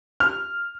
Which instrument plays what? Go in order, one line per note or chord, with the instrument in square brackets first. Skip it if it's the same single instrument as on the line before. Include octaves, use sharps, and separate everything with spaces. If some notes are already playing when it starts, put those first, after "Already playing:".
[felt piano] F6